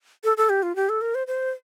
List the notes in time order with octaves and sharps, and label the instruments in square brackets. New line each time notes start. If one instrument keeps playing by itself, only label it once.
[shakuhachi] A4
A4
G4
F4
G4
A4
A#4
C5
C5